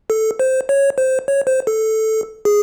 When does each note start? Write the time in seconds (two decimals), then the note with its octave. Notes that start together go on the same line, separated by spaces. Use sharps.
0.10 A4
0.39 C5
0.69 C#5
0.98 C5
1.28 C#5
1.47 C5
1.67 A4
2.45 G#4